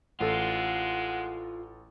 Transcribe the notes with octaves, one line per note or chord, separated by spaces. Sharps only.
A1 G#3 F4 A4 F#5